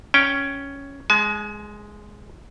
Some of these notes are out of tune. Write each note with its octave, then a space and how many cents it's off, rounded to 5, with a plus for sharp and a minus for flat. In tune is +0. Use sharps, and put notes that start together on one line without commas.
C#4 +5 G5 +0
G#3 +0 G#5 +45